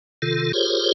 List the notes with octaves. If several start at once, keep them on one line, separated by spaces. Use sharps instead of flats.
C3 D#3 F4 A4
F4 G4 G#4 A#4 C5 C#5